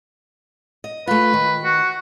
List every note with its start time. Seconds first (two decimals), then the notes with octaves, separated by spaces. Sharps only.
0.84 D#5
1.07 A3 F4 B4
1.33 D#3
1.64 F#4